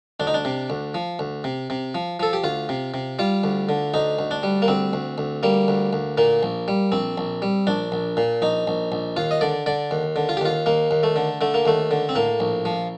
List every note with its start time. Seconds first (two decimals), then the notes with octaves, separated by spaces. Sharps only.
0.20 D2 D4
0.27 D#4
0.34 D4
0.45 C3
0.70 D2
0.94 F3
1.19 D2
1.44 C3
1.70 C3
1.95 F3
2.20 F3 A4
2.33 G4
2.44 D2 F4
2.69 C3
2.94 C3
3.19 G3 F4
3.44 D2
3.69 D3
3.94 D2 D#4
4.19 D2
4.31 D4
4.43 G3
4.62 A#3
4.68 D2 C4
4.93 D2
5.18 D2
5.43 G3 A#3
5.68 D2
5.93 D2
6.18 A#2 A#3
6.43 A#1
6.68 G3
6.92 A#1 C4
7.18 A#1
7.42 G3
7.67 A#1 D4
7.92 A#1
8.17 A#2
8.42 A#1 D#4
8.67 A#1
8.92 A#1
9.17 D#2 F4
9.31 D#5
9.41 D3 D5
9.66 D3 D5
9.91 D#2
10.16 D3
10.29 F4
10.37 G4
10.41 D#2 F4
10.66 D#2 A#3
10.91 D#2
11.03 A3
11.16 D3
11.41 D3 A3
11.54 A#3
11.65 D#2 A3
11.91 D3
12.09 C4
12.15 A2 A#3
12.40 A#1
12.65 F3